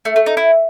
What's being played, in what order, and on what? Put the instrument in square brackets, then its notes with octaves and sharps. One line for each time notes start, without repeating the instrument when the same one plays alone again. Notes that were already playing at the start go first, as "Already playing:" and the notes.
[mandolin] A3
A3
D#4
E4